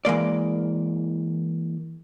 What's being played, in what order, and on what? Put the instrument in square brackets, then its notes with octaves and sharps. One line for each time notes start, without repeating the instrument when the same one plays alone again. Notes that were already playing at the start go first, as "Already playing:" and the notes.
[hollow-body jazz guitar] E3 G#3 A#3 D5